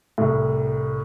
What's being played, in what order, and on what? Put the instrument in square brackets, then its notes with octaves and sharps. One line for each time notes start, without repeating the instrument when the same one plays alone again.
[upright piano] C2 A2